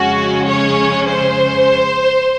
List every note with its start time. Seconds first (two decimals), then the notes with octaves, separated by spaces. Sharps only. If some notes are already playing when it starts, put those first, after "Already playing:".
Already playing: F2 C#3 G#3 C#4 F#4
0.49 C#5
1.07 C5